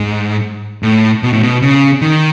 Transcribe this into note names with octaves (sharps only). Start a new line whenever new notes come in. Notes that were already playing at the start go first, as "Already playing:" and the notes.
Already playing: G#2
A2
B2
A2
B2
C#3
D#3